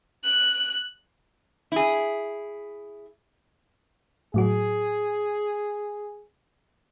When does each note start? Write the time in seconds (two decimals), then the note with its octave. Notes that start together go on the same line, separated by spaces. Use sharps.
0.25 F#6
1.72 E4 G#4
4.34 A2 F#3 F#4 G#4